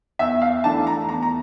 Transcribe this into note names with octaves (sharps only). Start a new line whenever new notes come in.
E2 E5
F5
E3 A3 D4 A5
A#5
E2 A#5
A#5